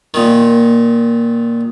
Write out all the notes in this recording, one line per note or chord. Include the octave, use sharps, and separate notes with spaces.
A#2 D#3